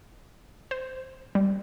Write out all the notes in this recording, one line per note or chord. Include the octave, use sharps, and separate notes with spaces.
C5
G3